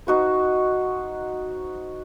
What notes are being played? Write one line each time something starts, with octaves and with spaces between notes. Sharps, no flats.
D#4 F#4 C5